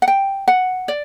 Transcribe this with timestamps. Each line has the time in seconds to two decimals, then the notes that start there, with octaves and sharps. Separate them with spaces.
0.02 F#5
0.08 G5
0.48 F#5
0.88 D5